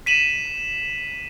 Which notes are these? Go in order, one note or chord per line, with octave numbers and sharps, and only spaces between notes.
B6 D#7 E7 F#7